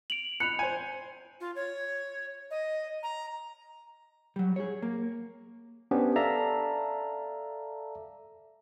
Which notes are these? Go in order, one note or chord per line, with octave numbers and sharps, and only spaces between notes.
D7 F7 F#7
B5 F#6 C#7 F7
C5 G#5
F4
C#5
D#5
A#5
F#3 G3
G#4 C#5
A#3
B3 C#4 D4 G4 C5
A4 D5 E5 F5 A5 A#5